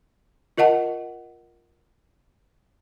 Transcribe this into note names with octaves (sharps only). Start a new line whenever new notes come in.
F4 A#4 D#5 F#5 A5